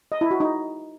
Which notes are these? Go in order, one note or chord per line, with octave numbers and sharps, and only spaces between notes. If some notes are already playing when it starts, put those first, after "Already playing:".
D#5
E4
F#4
D#4